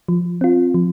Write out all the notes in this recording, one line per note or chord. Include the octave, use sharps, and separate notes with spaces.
F3
C4 F4
F3